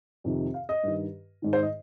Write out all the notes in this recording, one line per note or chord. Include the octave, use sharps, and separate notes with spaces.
F2 C3 D#3
F5
D#5
G2 D#3
G#2 D#3
C5
D#5